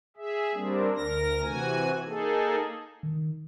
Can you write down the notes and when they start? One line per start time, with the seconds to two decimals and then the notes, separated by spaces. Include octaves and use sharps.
0.17 G#4 E5
0.54 G3 A#3 C4 D4
0.96 D2 A#4 A#6
1.42 C3 E3 F#4 G#5
2.06 A#3 D#4 G#4 A4
3.03 D#3